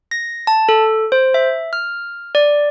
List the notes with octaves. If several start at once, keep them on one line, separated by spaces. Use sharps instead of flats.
A#6
A5
A4
C5
E5
F6
D5